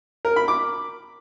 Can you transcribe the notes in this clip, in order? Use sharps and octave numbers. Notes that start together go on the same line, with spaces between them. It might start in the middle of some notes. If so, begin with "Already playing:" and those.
A#4
B5
D6